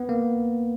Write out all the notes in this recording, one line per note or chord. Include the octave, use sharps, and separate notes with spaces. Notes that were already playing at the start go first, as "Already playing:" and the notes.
Already playing: B3
A#3